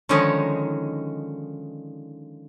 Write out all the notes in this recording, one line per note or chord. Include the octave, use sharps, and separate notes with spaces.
D3 D#3 F3 G#3 C#4 D#4